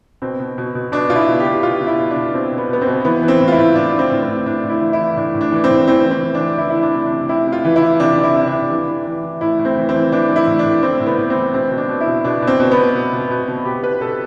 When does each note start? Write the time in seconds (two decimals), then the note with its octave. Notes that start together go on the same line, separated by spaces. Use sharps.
0.22 B2 C4
0.40 B2
0.58 B2
0.75 B2
0.92 B2 D4
1.10 B2 F4
1.16 E4
1.28 B2
1.40 G4
1.46 B2
1.63 B2 F4
1.80 B2
1.87 E4
1.99 B2
2.11 D4
2.16 B2
2.34 B2 C4
2.52 B2
2.57 B3
2.69 B2 B3
2.81 C4
2.87 B2
3.05 E3 B3
3.23 E3
3.28 C4
3.40 A2
3.48 F4
3.52 E4
3.58 A2
3.75 A2 D4
3.93 A2
3.99 C4
4.11 A2
4.23 C4
4.28 A2
4.46 A2 D4
4.64 A2
4.69 E4
4.81 E3
4.93 E4
4.99 E3
5.17 A2 D4
5.35 A2
5.41 D4
5.52 E3
5.64 C4
5.70 A2
5.87 E3 C4
6.05 E3
6.11 C4
6.24 E3
6.35 D4
6.40 E3
6.58 E3 E4
6.70 E4
6.76 E3
6.83 D4
6.94 C3
7.06 D4
7.11 C3
7.29 C3 E4
7.47 C3
7.52 F4
7.65 E3
7.76 E4
7.82 E3
8.00 C3 D4
8.18 C3
8.23 E4
8.36 C3
8.48 C3 D4
8.70 E3
8.88 E3
9.06 E3
9.23 E3
9.41 A2 E4
9.59 A2
9.65 C4
9.77 E3
9.89 C4
9.95 E3
10.12 E3 D4
10.29 E3
10.36 E4
10.47 A2
10.59 D4
10.65 A2
10.82 A2 C4
11.00 A2
11.06 B3
11.18 A2
11.30 C4
11.35 E3
11.54 B2 C4
11.71 B2
11.77 D4
11.89 B2
12.01 E4
12.07 B2
12.24 B2 D4
12.42 B2
12.47 C4
12.60 B2
12.72 B3
12.78 B2
12.95 B2
13.13 B2
13.30 B2
13.48 B2
13.65 B2 G4
13.83 B2 B4
14.01 B2 A4